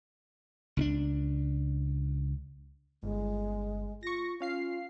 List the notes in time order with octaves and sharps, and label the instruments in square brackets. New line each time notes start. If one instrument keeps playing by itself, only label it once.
[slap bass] C#2 C#4 D4
[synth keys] G1 [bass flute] G#3
[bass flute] F4 [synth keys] C#6 A#6
[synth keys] C#4 F5 C7 [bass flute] F4